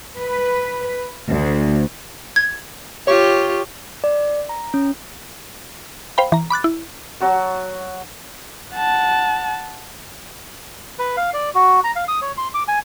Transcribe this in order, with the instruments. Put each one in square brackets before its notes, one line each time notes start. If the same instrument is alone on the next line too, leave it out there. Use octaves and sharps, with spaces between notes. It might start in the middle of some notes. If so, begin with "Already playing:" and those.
[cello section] B4
D2
[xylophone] G#6
[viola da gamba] F4 G4 [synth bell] C#5 C#6
[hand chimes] D5
A#5
C#4
[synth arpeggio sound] C5 F5 G5 B5
E3 A#5
B5 D6 F#6 A6
E4
[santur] F#3 F#4 A5
[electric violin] F#5 A5
[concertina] B4
F5
D5
F#4
A#5
F5
D#6
C#5
C6
D6
G#5